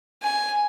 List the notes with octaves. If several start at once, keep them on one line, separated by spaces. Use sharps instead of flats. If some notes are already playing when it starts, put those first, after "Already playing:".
G#5